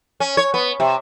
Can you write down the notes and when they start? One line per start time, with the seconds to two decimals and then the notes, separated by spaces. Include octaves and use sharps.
0.20 C#4
0.37 C#5
0.54 B3
0.80 C3